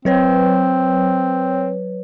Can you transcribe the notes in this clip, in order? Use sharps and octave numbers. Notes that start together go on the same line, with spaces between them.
F#3 C4 B4 C#5